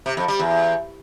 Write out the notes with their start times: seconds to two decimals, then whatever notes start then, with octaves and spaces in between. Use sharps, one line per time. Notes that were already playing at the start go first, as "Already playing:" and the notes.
0.06 C3
0.17 F2
0.28 G3
0.39 E2